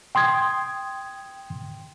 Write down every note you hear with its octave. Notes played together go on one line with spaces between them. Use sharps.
G5 C6 D#6 G#6